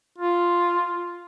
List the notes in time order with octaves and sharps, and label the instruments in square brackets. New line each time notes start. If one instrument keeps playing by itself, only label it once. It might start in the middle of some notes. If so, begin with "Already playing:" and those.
[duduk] F4